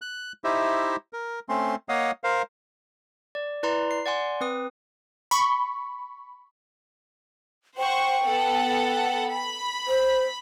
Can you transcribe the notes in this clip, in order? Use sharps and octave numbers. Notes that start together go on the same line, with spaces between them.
F#6
D#4 E4 G4 C5 D#5 E5
A#4
A3 C4 C#4 C6
A#3 C#5 D#5 F5 F#5 D#6
A#4 C5 F5
D5
E4 B4 D5 A#5 C6
C7
D5 F#5 G#5 C6
C4 B4 D#6
B5 C#6
C5 F#5 G5 C#6
B3 A4 F#5
B5
C5